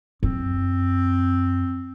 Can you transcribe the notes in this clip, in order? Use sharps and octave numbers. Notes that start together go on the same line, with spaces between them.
F#2 C4